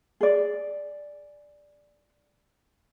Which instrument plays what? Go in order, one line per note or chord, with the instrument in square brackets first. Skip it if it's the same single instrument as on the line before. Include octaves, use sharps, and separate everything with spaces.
[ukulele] G#4 D5